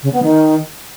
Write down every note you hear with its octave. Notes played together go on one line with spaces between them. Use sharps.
C#3
B3
D#3